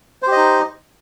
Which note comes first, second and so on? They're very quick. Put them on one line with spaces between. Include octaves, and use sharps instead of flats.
C5 G4 D#5 D#4